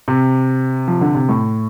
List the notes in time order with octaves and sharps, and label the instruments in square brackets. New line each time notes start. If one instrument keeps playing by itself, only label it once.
[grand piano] C3
F3
D3
C3
A2